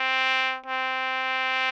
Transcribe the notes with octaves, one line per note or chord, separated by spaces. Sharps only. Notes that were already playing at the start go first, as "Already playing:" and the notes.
Already playing: C4
C4